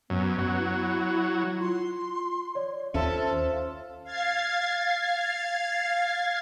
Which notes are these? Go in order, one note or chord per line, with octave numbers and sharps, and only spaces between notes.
F#2 B3
F#3
E4
F4 C6
C#5 D5
D#2 C#4 F4 A4 C5 E5
F5 G#6 A6 C7